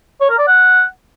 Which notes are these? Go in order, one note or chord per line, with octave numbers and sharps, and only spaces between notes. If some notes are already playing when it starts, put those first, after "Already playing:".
C#5
A#4
D5
F#5